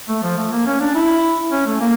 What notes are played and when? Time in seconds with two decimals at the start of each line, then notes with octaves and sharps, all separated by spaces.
0.09 A3
0.23 F3
0.38 A3
0.52 A#3
0.66 C#4
0.81 D4
0.95 E4
1.52 C#4
1.66 A3
1.81 A#3